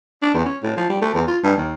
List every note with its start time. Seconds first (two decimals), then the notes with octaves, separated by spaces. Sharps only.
0.22 D4
0.34 E2
0.45 C#4
0.63 A2
0.77 F3
0.89 G3
1.02 A3
1.14 E2
1.27 F4
1.43 G2
1.57 D#2